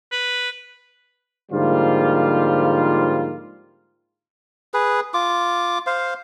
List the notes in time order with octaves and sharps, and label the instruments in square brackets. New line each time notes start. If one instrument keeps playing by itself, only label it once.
[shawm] B4
[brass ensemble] G#2 D3 F3 G3 A#3 F4
[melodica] G#4 B4
F4 D6
C5 F5